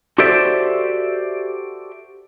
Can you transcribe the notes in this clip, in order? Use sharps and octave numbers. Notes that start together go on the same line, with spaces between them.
F#4 G4 A4 C5 D5 E5